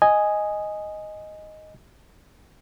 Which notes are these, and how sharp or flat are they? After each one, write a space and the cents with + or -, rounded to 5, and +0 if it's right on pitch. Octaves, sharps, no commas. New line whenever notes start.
D#5 +0 G#5 +0